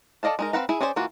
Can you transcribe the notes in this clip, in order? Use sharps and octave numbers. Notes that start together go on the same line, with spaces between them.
A4 D5 D#5 F5 A5
G#3 D#4 A#4
C4 B4 F5 F#5 A#5
E4 G#4 B5
C#4 D4 G#4 C5 D5
E3 A#3 F4 F#4